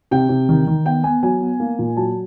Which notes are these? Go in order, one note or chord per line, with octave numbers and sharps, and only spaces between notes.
C3 G5
C3
D#3
D#3
B3 G5
B3 G#5
F#3 G#5
B3
A#3
A#2
F#3 A5